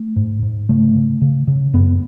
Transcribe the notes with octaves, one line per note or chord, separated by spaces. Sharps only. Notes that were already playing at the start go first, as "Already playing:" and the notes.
Already playing: A3
G#2
G#2
C#3 A3
C#3
C#3
C#3
F#2 B3